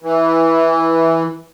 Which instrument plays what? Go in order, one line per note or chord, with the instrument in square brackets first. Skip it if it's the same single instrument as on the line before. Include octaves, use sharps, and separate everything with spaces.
[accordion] E3